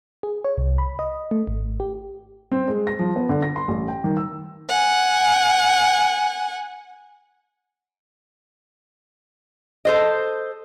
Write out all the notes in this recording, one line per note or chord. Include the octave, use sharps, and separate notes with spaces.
G#4
C#5
C2
B5
D#5
A3
G#1
G4
C4
G#3
A#6
F3
B3
D3
A#6
C6
A1
G5
D#3
E6
F#5 G#5
A4 C5 D#5